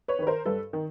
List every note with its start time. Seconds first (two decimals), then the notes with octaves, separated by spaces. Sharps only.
0.08 B4 C#5
0.19 D#3 B4
0.27 A#4 C5
0.46 G2 A4 B4
0.73 D#3